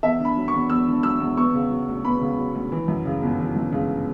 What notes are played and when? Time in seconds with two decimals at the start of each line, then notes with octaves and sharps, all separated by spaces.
0.03 E2 E5
0.20 D3
0.25 B5
0.37 F#3
0.48 C#6
0.53 E2
0.70 E2 E6
0.87 D3
1.03 F#3 E6
1.20 E2
1.37 B3 C#6
1.54 C#3
1.71 F#3
1.88 D2
2.05 B3 B5
2.21 C#3
2.38 F#3
2.55 D2
2.72 E3
2.88 F#2
3.06 C#3
3.22 G1
3.39 E3
3.56 F#2
3.72 C#3